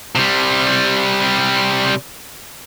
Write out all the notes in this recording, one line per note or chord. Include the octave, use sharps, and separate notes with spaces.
C3 G3